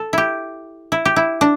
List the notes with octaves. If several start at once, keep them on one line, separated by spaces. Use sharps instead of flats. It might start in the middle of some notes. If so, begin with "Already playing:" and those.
Already playing: A4
E4 G4
E4
G4
E4
D4